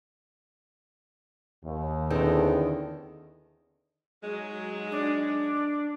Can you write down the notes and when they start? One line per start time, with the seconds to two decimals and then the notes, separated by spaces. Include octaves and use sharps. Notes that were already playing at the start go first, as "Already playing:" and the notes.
1.64 D#2
2.10 E2 D3 D#3 C4 A4 G5
4.23 F#3 G#3 D#4 G#4
4.92 D4